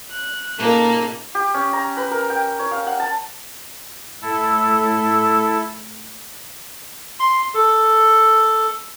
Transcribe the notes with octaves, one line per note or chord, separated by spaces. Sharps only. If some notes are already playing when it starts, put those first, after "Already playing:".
F#6
A#2 C#3 A#3 D#4 A4
G4
C#4
A#5
B4
A#4
G5
C#5
F5
F#5
A5
A2 E4 A4
C6
A4